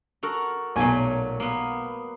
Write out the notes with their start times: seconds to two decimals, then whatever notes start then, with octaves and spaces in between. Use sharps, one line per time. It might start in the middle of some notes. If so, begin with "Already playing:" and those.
0.23 F#4 A4 A#4
0.76 B1 A#2 F#3 A3 G#5
1.40 A#3 B3